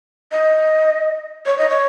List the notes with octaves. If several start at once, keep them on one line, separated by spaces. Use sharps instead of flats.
D#5
C#5
D#5
C#5